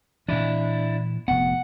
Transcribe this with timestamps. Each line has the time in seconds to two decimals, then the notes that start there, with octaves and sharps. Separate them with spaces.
0.29 A#2 E3 D4 E4
1.28 F1 B3 F#5